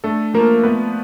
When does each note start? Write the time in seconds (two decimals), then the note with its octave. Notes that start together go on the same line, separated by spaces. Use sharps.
0.04 A3 D4 A4
0.34 F3 A#3 A#4
0.63 A3 B3 B4